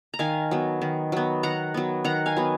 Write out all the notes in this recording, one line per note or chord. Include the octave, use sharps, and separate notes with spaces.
A#5
D#3 F5 G#5
F#3 B3
D#3
F#3 B3
D#3 F#5 A#5
F#3 B3
D#3 F#5 A#5
F5 G#5
F#3 B3